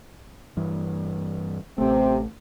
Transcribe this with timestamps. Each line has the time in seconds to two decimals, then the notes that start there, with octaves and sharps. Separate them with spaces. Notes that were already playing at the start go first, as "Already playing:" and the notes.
0.57 G2 E3
1.78 A1 C3 A3 C4